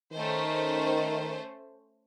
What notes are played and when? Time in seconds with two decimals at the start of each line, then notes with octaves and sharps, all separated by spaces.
0.13 D#3 A3 C#4 C5